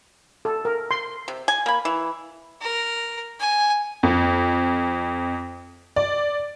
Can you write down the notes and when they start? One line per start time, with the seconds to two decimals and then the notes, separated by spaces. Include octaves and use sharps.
0.45 A4
0.65 A#4
0.91 C6
1.28 C3
1.48 G#5
1.66 A#3 B5
1.85 E3
2.61 A#4
3.40 G#5
4.03 F2
5.96 D5